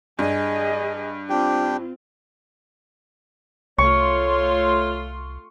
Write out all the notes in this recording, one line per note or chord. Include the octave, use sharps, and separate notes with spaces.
G2 G#4 D#5
C4 D4 F4 G4 G5
C2 A3 F4 C#5 C6 C#6